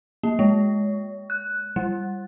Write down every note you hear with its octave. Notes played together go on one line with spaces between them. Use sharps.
A#3
G#3
F#6
G3